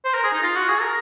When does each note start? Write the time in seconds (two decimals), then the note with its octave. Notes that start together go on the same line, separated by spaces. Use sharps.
0.05 C5
0.14 A#4
0.24 G#4
0.33 D#4
0.43 F4
0.56 F#4
0.69 G#4
0.81 A#4